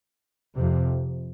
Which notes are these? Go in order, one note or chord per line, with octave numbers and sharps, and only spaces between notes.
F2 C3